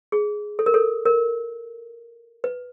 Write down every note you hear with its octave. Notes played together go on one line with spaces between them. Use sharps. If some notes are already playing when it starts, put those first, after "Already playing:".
G#4
A4
A#4
A4
A#4
B4